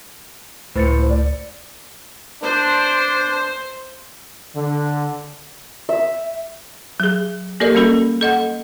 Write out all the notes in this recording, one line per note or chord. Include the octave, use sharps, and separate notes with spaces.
C#2 A2 C5 A6 C#7
D5
D4 C5
D3
E5
F#3 G#4
A#3 G4 A4 A#4 D5 D#5
G3 A#3 C#4 F#4 A4
A4 D#5 F#5